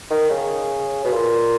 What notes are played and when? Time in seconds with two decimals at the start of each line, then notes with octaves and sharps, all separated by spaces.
0.10 D#3
0.30 C#3
1.05 B2
1.12 A#2